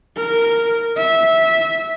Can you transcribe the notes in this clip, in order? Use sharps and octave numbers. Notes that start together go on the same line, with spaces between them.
A#4
E5